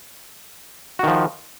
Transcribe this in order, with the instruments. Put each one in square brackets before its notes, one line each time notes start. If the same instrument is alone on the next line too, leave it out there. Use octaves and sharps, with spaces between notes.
[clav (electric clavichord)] F#4
D#3
F3